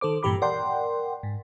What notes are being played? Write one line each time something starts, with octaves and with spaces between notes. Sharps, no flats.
D#3 A4 C5 D6
G2 A#2 E3 G4 B5 D6
A#4 D5 F#5 G5 C6
G#2